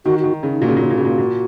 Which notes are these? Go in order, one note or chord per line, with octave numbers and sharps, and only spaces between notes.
D#3 F#4
D#3 F#4
D#4
C#3
D#4
A#2 F#4
C#3
A#2
C#3
A#2
C#3
A#2
A#2